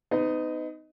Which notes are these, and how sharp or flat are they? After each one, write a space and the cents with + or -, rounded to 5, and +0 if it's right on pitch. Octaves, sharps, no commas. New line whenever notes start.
B3 +40 D#4 +0 D#5 +0